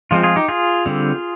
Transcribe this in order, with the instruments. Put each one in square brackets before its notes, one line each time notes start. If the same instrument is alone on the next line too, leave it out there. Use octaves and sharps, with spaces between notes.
[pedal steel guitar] F3 G#3 C4 F4
F4 G#4
D#4 G4
F4 G#4
D3 G3 C4